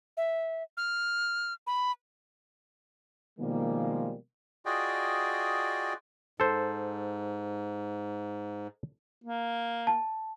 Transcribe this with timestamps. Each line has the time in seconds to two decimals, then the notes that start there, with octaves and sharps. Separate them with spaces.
0.17 E5
0.77 F6
1.67 B5
3.39 B2 D#3 F3 G3 G#3 A#3
4.66 F4 F#4 G#4 D5 D#5 G5
6.40 G#2 A4 C5
9.24 A#3
9.87 A5